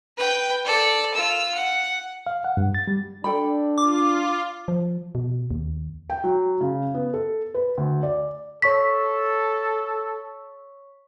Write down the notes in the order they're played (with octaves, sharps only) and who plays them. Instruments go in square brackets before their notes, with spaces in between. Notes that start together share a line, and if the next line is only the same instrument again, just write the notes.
[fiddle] B4 G5
A4 D5
F4 E6
F#5
[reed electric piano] F5
F#5
G2
A6
G3
[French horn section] D4 [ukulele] A4 G5 B5
[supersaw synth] F4 [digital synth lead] D6
[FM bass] F3
B2
D#2
[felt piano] G5
F#3
C#3
B3
A4
B4
D2
D5
[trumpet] A4 [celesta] C#5 C#6 B6